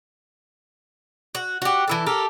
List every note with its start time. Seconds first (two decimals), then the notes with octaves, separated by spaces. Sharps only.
1.35 F#4
1.62 F#4 G4
1.88 E3 E4 A4
2.06 G4 A4 A#4